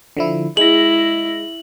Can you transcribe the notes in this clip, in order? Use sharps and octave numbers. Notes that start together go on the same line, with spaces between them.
D3 F3 E4
G#3 E4 A#6 F#7